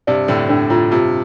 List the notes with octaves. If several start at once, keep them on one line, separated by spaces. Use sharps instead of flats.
G2 C3 D5
A2 D3 D4
A2 D4
A2 F4
G2 C3 F4